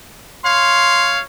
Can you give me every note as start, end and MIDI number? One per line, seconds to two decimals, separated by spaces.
0.44 1.21 73
0.44 1.21 77
0.44 1.10 84